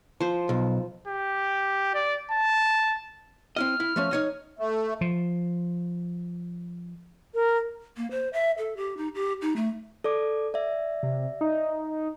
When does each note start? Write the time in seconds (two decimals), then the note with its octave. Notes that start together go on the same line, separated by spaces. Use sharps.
0.20 F3 C5
0.49 B1
1.08 G4
1.94 D5
2.31 A5
3.56 C4 E4 D#5 F6
3.80 E4
3.96 F3 A3 C#4
4.11 D#4 C#5 D#5
4.59 A3
5.01 F3
7.34 A#4
7.97 A#3
8.11 C5
8.33 E5
8.58 A4
8.77 G4
8.97 D#4
9.15 G4
9.42 D#4
9.56 A3
10.04 A4 D5 D6
10.54 D5 E5
11.03 C3
11.41 D#4